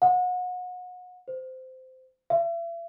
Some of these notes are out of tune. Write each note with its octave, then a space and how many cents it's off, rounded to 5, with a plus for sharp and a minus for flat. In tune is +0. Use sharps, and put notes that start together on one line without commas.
F#5 -30
C5 -15
E5 +40